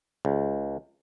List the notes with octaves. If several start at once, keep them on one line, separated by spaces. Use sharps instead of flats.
C#2